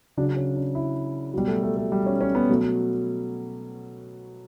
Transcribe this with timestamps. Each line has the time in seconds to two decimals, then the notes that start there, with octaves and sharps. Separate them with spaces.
0.17 C#3 F#3 D4
0.37 C#4
0.56 D4
0.75 E4
1.34 B2 F#3 G3
1.47 A3
1.63 A3
1.77 A3
1.92 G3
2.06 C#4
2.21 C#4
2.35 B3
2.49 B2 F#3 A3